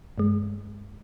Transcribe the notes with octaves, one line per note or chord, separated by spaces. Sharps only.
G2 G#3